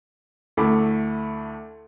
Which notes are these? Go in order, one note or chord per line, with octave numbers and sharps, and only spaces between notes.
D2 A3 E4 B5 D6